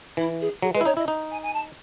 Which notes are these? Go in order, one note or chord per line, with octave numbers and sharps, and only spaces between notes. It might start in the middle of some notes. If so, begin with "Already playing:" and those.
E3 E4
G#4
F#3 G#4
G#3 B4
E4
D#4 C#5
E4 D#5
D#4
G#5
G#5
A5